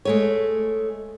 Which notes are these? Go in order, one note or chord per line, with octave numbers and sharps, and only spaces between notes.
G#3 A3 C#5